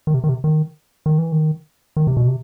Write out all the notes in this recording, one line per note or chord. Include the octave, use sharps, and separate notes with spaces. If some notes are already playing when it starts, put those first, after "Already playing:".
D#3
C3
D#3
C3
D#3
D#3
E3
D#3
D#3
C3
B2
C3